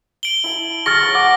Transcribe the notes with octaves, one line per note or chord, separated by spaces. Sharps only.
D7 F#7 G7
E4 A5
G#4 C#6 F6 A6 A#6
C#5 B5
F#5 A5 D6